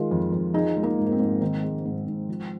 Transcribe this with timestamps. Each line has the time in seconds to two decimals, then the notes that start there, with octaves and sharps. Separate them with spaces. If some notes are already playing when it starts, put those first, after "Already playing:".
Already playing: D#3 G#3 F4 A#4
0.11 F2
0.33 F2
0.54 F3 D#4 G#4
0.77 G#3
0.83 A#3 D#4
0.98 G#2
1.06 A#3
1.12 C4
1.20 G#2
1.41 D#3 C4
1.63 G#3
1.85 G#2
2.06 G#2
2.29 F3